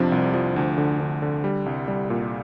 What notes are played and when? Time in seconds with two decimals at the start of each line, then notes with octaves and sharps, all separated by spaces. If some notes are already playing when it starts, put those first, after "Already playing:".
Already playing: F2 C3 F3 D4
0.12 C2
0.34 F3
0.56 D2
0.78 D3
1.00 D3
1.22 D3
1.44 G3
1.66 C2
1.88 G3
2.10 A#2